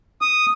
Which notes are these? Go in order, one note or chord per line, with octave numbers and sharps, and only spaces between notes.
D#6